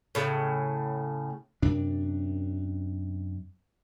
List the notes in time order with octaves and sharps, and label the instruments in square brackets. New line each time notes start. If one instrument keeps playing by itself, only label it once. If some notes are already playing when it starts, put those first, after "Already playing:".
[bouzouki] A2 C#3
[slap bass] F#2 C3 D4